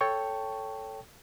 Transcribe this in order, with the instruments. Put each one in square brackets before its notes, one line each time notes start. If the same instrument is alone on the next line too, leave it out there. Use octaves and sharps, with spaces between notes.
[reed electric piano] A4 C#5 G5 A5 C#6